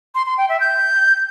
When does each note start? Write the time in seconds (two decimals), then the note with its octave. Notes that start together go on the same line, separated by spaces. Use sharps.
0.15 C6
0.26 C6
0.38 G5
0.49 E5
0.60 G6